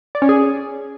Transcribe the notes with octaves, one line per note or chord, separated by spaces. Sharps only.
D5
C#4
G#4